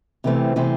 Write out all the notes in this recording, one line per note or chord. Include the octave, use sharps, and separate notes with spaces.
C3 E3 A3 C4
C3 E3 A3 C4